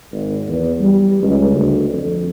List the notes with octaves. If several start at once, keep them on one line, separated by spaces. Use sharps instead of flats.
G#1
E2
G3
C#2
D2
F2